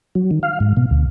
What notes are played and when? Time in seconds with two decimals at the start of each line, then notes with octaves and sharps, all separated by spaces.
0.15 F#3
0.31 D#3
0.43 F5
0.60 G#2
0.77 B2
0.91 D2